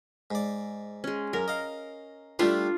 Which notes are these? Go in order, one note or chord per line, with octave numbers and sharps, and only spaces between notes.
G#2 D5
G#3 C#4
F#2 A#4
D#5 F5
G3 A3 D4 F4 G4 E5